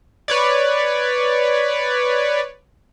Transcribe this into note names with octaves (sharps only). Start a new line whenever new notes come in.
B4 C#5 D5